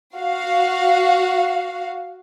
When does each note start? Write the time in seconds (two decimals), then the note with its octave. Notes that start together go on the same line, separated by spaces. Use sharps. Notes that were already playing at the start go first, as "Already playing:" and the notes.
0.16 F#4 F5